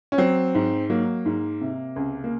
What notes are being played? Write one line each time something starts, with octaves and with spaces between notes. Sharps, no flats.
C#4
F#3 C4
G#2
F#3 A#3
G#2
C3
C#2
A#3